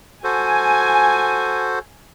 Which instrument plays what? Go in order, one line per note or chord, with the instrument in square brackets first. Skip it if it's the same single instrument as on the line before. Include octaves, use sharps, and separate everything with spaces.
[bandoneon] F#4 A4 C5 [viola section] G#5